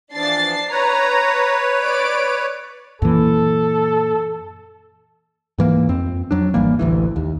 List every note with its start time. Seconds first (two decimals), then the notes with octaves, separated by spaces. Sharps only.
0.15 E3 F3 D4 A6 C7
0.70 B4 C#5 A#5
1.82 D5 D7
3.02 F#2 A#2 E3 A4
5.58 G#2 E3 A#3
5.89 F2 C4
6.31 F2 F#3 D4
6.54 G#1 E3 G3 A#3
6.79 A1 D2 E3
7.16 D#2